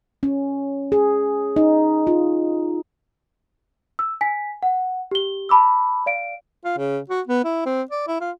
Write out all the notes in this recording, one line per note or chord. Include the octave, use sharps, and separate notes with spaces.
C#4
G#4
D#4
F4
E6
G#5 B6
F#5
G4 G7
A5 B5 D6 E6
D5 F5 D7
F4
C#3
F#4
B3
E4
C4
D5
E4
F4